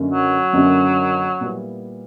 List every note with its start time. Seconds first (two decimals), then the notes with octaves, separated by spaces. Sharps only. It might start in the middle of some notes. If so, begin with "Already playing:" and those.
Already playing: F#1 F#2 D3 A#3 C#4
0.08 F#3
0.53 F#1 F#2 D3 A#3 C#4
1.41 A#2 G3 B3 E4